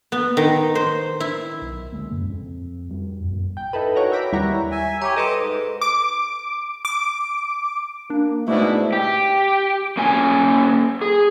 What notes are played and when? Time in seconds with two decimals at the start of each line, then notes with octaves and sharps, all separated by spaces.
0.12 B3
0.37 D#3
0.75 C5
1.20 E4
1.62 B1
1.92 D2 G#3 A#3
2.10 F#2 C#3
2.30 F2
2.89 F2 G3
3.24 A#1 F#2
3.57 G5
3.73 D#4 E4 A4 B4
3.95 D#4 F#4 A#4 C#5 F#5
4.11 C#5 E5 G5 A#5 B5 D6
4.32 D#2 G3 E4 C#5 F#5 A#5
4.71 E5 G#5
5.02 G4 C#5 A#5 D6
5.16 A4 B4 D#5 C6 D6
5.39 G#2
5.81 D6
6.85 D6
8.10 A#3 D4
8.48 G#2 B2 A3 D4 E4
8.93 G4
9.97 A#3 C#4 G#5
11.01 G#4